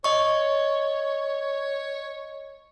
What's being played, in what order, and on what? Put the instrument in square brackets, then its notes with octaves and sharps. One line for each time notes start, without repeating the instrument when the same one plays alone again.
[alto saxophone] C#5 [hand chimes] D#5 C#6